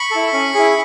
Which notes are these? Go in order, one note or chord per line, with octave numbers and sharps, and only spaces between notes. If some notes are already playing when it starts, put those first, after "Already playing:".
Already playing: B5 C#6
E4 A4
C#4
E4 G#4